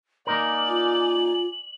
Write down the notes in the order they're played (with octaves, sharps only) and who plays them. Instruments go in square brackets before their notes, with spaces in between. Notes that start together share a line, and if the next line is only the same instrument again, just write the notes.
[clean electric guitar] A#3 D#4 A#4 [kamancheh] D5 G#5 [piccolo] F#7
[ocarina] F4